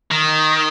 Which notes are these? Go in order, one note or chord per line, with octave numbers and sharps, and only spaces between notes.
D#3